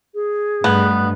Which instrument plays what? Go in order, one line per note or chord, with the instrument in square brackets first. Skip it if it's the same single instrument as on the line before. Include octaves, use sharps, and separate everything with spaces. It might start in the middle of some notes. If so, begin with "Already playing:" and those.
[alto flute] G#4
[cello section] G2 [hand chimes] A3 F#6 [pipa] B3